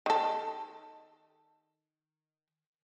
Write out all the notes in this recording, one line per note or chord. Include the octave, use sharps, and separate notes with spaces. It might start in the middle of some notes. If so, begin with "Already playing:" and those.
D#3 A4